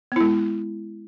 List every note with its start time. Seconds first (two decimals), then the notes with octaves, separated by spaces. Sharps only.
0.12 B3
0.16 E4
0.21 G#3